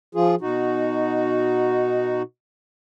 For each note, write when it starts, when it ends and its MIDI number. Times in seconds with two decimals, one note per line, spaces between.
0.15 0.35 53
0.15 0.35 65
0.15 0.35 68
0.41 2.22 47
0.41 2.22 63
0.41 2.22 66